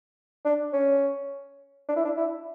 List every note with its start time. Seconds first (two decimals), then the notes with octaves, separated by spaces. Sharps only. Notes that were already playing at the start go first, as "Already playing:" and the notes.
0.45 D4
0.73 C#4
1.89 D4
1.96 E4
2.05 D4
2.17 E4